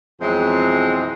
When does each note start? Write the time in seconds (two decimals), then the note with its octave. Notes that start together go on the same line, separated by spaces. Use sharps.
0.21 F2 B2 E3 F#3 G#3 C4